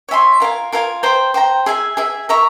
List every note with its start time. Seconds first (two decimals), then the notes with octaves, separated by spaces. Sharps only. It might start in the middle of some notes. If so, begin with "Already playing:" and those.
0.09 C#5 E5 G#5 C6
0.40 F4 A#4 F5 G#5
0.72 F4 A#4 F5 G#5
1.03 C5 G5 A#5
1.34 C5 G5 A#5
1.66 G#4 E5 G#5
1.97 G#4 E5 G#5
2.29 A#4 E5 A#5 C#6